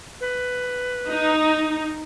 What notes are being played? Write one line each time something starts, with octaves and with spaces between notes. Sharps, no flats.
B4
D#4